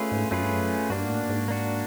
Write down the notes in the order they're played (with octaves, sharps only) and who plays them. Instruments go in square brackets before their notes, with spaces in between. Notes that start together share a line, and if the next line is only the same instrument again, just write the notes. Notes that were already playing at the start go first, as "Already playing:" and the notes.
Already playing: [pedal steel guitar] A3 C#4 F4 G#4 B4
[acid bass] G#2
[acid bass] F#2 [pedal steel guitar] A3 C#4 F4 G#4 B4
[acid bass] G2
F#2
[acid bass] G2 [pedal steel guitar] A#3 D4 F#4
[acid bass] G#2
A2
G#2
[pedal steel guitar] A#3 D4 F#4